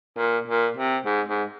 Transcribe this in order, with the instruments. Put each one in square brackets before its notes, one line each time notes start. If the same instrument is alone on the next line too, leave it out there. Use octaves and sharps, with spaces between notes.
[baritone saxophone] A#2
A#2
C3
G#2
G#2